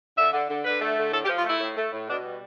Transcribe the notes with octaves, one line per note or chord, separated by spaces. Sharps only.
D3 E5
D3
D3
D3 B4
A3
D3
A2 A4
G4
F3
F4
A3 E4
A2
A3
A2
B2 D4
G3